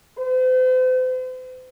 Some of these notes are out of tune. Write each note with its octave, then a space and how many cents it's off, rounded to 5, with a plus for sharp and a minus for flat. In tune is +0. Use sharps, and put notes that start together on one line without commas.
C5 -40